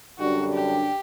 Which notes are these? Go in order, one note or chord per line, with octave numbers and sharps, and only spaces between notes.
F#2 D3 G3 D4 F#4
G4